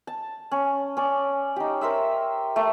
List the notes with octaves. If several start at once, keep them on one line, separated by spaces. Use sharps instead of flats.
A5
C#4
C#4 D5
D#4 G4
A#4 C5 E5 E6
A3 A#4